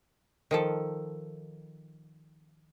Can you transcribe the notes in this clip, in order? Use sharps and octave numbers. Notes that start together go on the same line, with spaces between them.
D#3 F3 A4